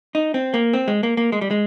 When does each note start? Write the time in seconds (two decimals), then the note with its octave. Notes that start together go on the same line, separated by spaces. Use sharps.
0.15 D#4
0.34 C4
0.54 A#3
0.73 C4
0.88 G#3
1.03 A#3
1.17 A#3
1.32 G#3
1.41 G3
1.51 G#3